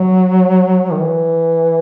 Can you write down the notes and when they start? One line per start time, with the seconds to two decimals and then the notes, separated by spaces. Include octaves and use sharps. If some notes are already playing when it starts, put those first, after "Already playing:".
Already playing: F#3
0.92 D#3
1.02 E3